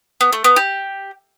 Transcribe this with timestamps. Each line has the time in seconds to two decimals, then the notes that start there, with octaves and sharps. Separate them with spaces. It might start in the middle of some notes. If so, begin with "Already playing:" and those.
0.21 B3
0.33 A3
0.44 B3
0.56 G4